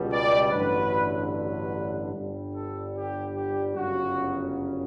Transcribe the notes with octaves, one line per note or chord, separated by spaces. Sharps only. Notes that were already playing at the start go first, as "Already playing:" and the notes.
Already playing: C#2 B2 G3
D5
A1 G2 D3 F#3 B4
B4
G1 G2 D3 G3
A4
G4
G4
G1 F#2 C#3 F#3 F#4